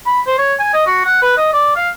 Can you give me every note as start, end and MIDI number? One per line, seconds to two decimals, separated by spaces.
0.06 0.21 83
0.27 0.34 72
0.38 0.54 73
0.59 0.71 80
0.74 0.86 75
0.87 1.04 66
1.05 1.18 78
1.22 1.34 71
1.37 1.52 75
1.53 1.75 74
1.76 1.88 77